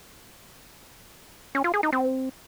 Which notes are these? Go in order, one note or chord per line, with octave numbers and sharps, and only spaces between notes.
C#4
F4
G#4
D#4
C4